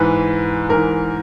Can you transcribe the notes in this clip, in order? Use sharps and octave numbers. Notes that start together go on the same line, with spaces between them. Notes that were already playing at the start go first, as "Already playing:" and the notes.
Already playing: G#2 E3 B4
G#2 E3 A#4